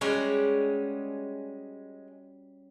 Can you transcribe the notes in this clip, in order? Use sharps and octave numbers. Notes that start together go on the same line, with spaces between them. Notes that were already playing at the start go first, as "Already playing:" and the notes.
G3 G#3 C#4 F#4